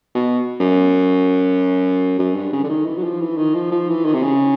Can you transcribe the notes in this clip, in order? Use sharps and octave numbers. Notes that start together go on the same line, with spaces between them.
B2
F#2
F#2
G2
C#3
D3
D#3
E3
F#3
F3
E3
D#3
F3
F3
E3
D#3
C3
C#3